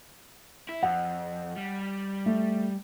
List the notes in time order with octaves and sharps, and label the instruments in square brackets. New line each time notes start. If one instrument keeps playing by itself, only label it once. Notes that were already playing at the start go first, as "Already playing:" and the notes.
[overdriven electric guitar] E4
[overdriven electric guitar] F2 [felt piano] F#5
[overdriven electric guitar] G3
[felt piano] A3